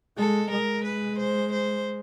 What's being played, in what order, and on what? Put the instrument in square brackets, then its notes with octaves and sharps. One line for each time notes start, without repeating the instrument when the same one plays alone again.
[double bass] G#3 [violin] A4
[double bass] G#3 [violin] A#4
[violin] B4
C5
C5